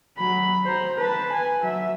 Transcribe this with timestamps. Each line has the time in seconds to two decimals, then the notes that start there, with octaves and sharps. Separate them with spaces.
0.18 F#3 B5
0.64 C5 A#5
0.97 B4 A5
1.32 G#5
1.62 F#3 E5